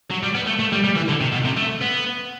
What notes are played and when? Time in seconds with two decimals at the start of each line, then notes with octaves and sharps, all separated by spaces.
0.11 F#3
0.23 G3
0.35 B3
0.47 A3
0.59 A3
0.72 G3
0.84 G3
0.96 E3
1.09 D3
1.21 C3
1.33 B2
1.45 C3
1.57 A3
1.82 B3